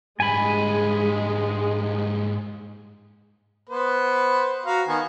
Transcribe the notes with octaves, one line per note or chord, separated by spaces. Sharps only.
G#2 G3 G#3 G#5 B5
B3 B4 C5
F#4 F5 A#5
D#3 B3 G#5